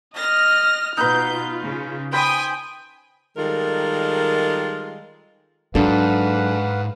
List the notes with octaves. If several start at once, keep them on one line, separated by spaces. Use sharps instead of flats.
D#5 F6 A#6
B2 D#4 F4 B4 G6
C#3
C5 G5 G#5 B5 C6 D#6
D#3 G3 G#3 F4 A4 A#4
G#2 F#3 D4 A4 B4 F5 F#5